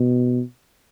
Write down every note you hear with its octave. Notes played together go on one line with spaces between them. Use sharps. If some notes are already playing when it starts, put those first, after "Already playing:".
Already playing: B2